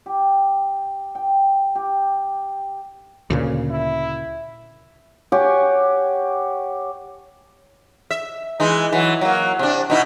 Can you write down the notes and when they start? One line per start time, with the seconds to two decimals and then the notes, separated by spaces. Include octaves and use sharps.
0.06 G4
1.15 G5
1.75 G4
3.30 D2 A#2 C#3
3.71 E4
5.32 G4 C#5 F#5 G#5
8.11 E5
8.60 E3 G#3 D#4
8.92 E3 F#3
9.21 F#3 A#3
9.59 C3 D4
9.90 B2 D#4 E4